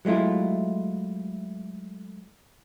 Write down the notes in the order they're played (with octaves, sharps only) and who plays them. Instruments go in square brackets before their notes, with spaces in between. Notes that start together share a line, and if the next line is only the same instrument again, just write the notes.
[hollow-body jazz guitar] F#3 G#3 A3 E4 F4